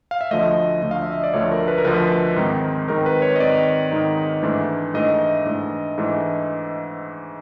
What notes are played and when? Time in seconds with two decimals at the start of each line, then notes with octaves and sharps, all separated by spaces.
0.11 F5
0.21 E5
0.31 D2 D3 F3 A3 D#5
0.82 D2 D3 F3 A3
0.91 F5
1.02 E5
1.12 D#5
1.23 D5
1.33 D2 D3 F3 A3 C#5
1.52 A#4
1.68 B4
1.78 A#4
1.85 D2 D3 F3 A3 B4
2.36 G#2 D#3 G#3 C4 D#4
2.88 G#2 D#3 G#3 C4 D#4 A#4
3.06 B4
3.22 C#5
3.36 D#5
3.40 G#2 D#3 G#3 C4 D#4 D5
3.91 G#2 D#3 G#3 C4 D#4
4.43 G#2 E3 A3 D4
4.94 G#2 E3 A3 D4 D#5
5.45 G#2 E3 A3 D4
5.98 G#2 E3 A3 D4